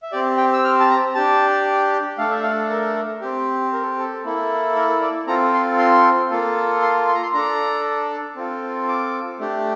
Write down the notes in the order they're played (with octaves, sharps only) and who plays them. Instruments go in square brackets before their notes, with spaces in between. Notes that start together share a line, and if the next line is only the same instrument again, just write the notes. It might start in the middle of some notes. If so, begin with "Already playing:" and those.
[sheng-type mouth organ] E5
C4 G4 D5
G5
E6
F6
A5
A#5
D4 G4 A5
A3 D4 A4 F5
E5
F5
A#4
C4 G4
A#4
A4
A4
A#3 E4 A4
A#4
D5
C4 F4 A4 A#5
C6
C6
A#3 F4 A4
C6
C6
A#5
C6
D4 A4 A#5
C4 F4 A4
D6
A3 D4 G4